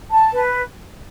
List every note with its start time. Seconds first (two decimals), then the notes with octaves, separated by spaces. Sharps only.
0.11 A5
0.34 B4